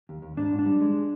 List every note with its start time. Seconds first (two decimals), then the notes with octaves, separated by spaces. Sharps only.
0.09 D#2
0.22 D#2
0.37 G#2 D4
0.52 G#2
0.59 D4
0.66 G3
0.81 G#3